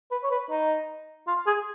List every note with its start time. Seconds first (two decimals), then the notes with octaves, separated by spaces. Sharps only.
0.11 B4
0.24 C#5
0.31 B4
0.51 D#4
1.27 F4
1.47 G#4